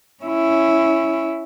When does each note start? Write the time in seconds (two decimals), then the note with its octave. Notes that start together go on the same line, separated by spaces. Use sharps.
0.23 C#4 E4